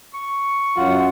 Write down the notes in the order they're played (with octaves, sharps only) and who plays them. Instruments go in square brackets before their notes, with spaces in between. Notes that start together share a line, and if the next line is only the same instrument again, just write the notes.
[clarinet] C#6
[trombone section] F#2 [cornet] F4 [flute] F#5